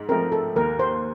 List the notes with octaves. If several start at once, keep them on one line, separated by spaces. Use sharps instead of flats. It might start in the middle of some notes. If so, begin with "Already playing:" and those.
Already playing: G#2
F3 A3 C4 A#4
A4
D#2 A#4
C5